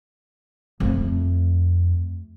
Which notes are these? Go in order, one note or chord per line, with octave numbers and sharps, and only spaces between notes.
F2 A3